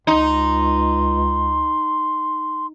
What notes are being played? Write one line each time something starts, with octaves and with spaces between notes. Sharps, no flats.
C#2 D#4 C6